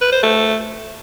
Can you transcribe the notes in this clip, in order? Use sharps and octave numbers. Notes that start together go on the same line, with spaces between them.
B4
C5
A3